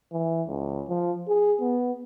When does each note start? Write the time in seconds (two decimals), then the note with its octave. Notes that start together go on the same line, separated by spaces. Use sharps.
0.12 E3
0.48 C#2
0.88 F3
1.28 G#4
1.61 B3